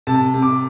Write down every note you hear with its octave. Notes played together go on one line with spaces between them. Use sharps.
C3 A5
C3
D6